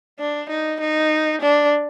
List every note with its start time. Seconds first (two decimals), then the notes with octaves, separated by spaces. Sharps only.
0.19 D4
0.49 D#4
0.81 D#4
1.41 D4